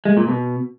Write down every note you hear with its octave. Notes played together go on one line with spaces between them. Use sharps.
G#3
A#2
B2